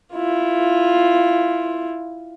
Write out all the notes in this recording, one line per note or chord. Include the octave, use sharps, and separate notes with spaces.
E4 F4